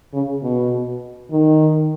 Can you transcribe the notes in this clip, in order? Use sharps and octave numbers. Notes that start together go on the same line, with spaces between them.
C#3
B2
D#3